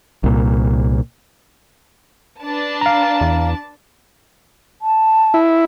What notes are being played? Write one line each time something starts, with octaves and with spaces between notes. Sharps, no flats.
C2 A#2
D4 B4 A5
F5 A#5
E2
A5
E4